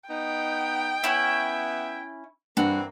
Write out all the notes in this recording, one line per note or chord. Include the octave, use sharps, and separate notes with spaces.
B3 D#4 G5
B3 C#4 E4 E5
G2 E3 A#3 C4 F#4